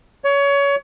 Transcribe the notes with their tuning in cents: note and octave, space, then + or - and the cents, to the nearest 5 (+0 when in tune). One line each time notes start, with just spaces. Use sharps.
C#5 +25